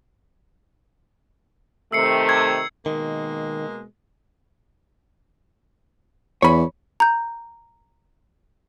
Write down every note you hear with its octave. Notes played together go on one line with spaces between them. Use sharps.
C3 D#3 A3 E6 C7 C#7
G#6
B2 D#3 G#3 A#3
E2 C#5 B5
A#5 G6